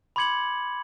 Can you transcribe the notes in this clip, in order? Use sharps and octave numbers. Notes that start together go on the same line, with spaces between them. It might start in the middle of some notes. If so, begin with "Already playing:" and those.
B5 C6 D6 G#6 C#7 F#7